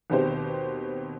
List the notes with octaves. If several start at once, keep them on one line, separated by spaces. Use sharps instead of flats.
D#2 B2 C4 G4 C5